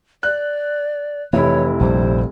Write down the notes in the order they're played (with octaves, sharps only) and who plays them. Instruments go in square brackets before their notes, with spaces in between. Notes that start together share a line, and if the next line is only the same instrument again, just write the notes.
[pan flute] D5 [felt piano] F#6
[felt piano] F1 E4 [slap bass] E3 [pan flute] C#5
[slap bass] A#1 G3 [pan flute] C5